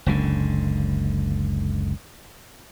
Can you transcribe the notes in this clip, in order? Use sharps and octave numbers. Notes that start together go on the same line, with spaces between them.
F#1 C#2 D3